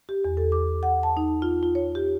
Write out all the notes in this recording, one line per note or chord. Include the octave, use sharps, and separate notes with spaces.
G4
E2
A4
D6
F#5
A5
D#4
F4
F4
C#5
G4